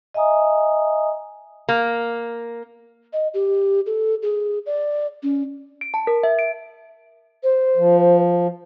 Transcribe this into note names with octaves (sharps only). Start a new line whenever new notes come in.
D#5 E5 G#5 A#5 D#6
A#3
D#5
G4
A4
G#4
D5
C#4
D7
A5
A#4
E5
D7
C5
F3